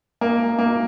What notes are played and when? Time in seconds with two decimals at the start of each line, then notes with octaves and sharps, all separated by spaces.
0.21 A#3
0.59 A#3